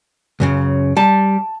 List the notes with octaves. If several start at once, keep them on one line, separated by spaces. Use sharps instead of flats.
C#2 F#2 C#3
G3 A5